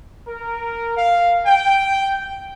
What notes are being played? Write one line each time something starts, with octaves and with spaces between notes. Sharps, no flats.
A#4
F5
G5